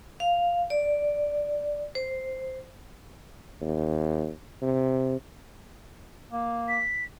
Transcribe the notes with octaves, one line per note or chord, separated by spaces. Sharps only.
F5
D5
C5
D#2
C3
A#3
B6